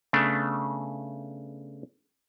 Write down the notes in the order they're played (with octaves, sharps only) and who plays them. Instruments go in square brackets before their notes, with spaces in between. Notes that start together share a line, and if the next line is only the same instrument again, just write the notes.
[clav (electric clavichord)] C#3 A3 B3 D4